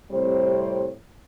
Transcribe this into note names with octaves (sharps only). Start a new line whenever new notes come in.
A2 C3 G3 C4 C5 C#5